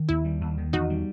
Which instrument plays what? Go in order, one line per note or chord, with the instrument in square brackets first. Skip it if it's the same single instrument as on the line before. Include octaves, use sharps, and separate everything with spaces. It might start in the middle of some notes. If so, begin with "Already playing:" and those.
Already playing: [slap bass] D#3
[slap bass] D#2 [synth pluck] E4
[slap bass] G3
D#2
D#3
[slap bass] E2 [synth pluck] D#4 F#4
[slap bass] G3